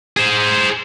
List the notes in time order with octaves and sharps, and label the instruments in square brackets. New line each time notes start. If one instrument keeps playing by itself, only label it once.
[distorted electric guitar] G#4 C5